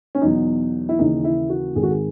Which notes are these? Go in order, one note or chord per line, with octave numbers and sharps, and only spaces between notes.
C#4
E2 B2 F#3 D#4
E4
D#2 C#3 E3 D#4
E4
F#4
G#1 G#2 D#3 G#4
F#4
G#4